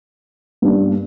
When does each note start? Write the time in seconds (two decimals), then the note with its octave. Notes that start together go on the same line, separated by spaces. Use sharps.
0.62 G2 G3 A#3 D4